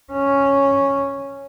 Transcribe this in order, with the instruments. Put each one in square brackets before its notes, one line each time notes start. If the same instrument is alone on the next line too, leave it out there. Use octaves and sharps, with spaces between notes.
[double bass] C#4